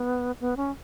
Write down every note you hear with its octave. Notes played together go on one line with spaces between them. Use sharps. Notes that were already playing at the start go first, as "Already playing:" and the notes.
Already playing: B3
B3
C#4